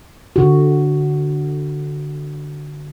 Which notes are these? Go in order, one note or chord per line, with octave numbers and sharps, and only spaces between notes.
D3 F#4